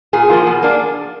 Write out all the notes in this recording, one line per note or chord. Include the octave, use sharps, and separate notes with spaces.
A#2 G#4
F3 A#3 F4
B2
A#3 D4